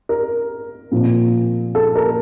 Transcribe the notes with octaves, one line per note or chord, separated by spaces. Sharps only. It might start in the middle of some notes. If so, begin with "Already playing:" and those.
A#4
A#2 F3 C4
A4
A#4